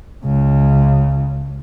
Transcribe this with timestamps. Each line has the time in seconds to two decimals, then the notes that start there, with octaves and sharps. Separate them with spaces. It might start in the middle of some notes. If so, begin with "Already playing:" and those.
0.24 C#2 C#3